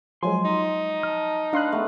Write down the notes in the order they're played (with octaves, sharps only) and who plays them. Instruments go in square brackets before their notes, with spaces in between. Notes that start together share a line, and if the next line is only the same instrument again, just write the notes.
[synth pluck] F3 F#3 G#3 [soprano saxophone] G#5 [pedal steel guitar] C6
[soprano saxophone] D#4
[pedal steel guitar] A5 F6
[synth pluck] D4 C6 F#6 [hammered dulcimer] B4 F5
[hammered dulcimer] A3 B3